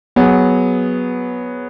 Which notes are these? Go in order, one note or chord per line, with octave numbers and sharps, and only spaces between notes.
F#3 B3 G#4